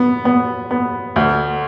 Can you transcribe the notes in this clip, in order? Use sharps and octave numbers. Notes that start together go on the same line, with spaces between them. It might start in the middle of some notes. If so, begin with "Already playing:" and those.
Already playing: B3
B3
B3
D2